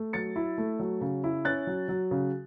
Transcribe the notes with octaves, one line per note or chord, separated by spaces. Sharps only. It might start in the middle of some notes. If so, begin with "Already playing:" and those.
Already playing: A3
F#3 A6 C#7
E4
A3
F#3
C#3
E4
C#4 F#6 A6
F#3
F#3
C#3